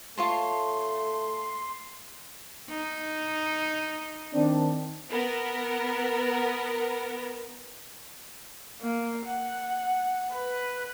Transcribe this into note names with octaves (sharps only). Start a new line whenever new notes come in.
A3 F4 C#5 A5 C6
D#4
D#3 C4 D4
B3 A#4
A#3
F#5
B4